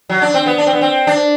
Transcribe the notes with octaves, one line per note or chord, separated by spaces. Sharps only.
F#3
D4
C4
B3
D4
C4
B3
C4
D4